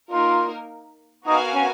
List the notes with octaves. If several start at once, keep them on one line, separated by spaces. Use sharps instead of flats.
A#3 D#4 F4 A#4
B3 D#4 F#4 A#4 F5 G#5
C#4